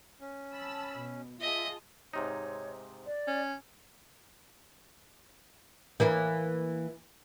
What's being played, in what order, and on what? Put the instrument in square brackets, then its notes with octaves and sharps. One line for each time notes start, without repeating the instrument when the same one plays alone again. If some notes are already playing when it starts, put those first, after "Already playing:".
[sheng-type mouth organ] C#4
[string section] A5 B5 E6
B2
[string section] F4 G#4 A5 [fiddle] D#5 [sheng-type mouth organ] E5
[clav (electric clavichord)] G#2 C3 D#4 [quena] C#5
[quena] D5
[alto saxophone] C#4
[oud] E3 A#3 E4